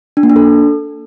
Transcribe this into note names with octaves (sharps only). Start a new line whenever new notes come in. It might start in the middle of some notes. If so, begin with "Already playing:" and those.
D4
A#3
D4
A4